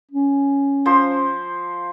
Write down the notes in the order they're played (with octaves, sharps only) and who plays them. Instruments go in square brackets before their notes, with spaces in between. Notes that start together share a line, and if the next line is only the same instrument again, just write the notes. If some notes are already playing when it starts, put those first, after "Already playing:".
[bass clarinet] C#4
[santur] F3 C5 C6